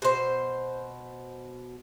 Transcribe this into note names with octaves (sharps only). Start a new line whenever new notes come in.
B2 C5